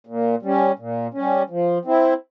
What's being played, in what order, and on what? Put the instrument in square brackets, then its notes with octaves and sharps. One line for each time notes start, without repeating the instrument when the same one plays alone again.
[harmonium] A#2
G3 C#4
A#2
G3 C#4
F3
C4 E4